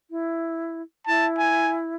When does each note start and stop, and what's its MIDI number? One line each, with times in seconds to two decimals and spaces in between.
0.10 0.82 64
1.07 1.96 64
1.07 1.27 81
1.38 1.77 80